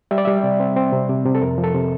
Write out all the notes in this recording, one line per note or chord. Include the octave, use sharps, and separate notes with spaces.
G3 E5
D5
G3 E5
C3
C4
C4
C3
C3
C3
A4
F2 A#4
F3
A4
C3